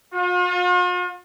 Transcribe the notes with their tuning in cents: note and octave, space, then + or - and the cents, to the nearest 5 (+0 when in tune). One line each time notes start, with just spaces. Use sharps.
F4 +45